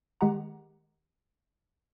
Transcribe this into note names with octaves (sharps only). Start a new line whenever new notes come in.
D#3 G#3 G4 F#5 A#5